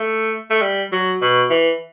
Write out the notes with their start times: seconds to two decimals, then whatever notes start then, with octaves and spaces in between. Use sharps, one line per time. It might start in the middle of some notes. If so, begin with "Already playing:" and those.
Already playing: A3
0.50 A3
0.62 G3
0.92 F#3
1.22 B2
1.50 E3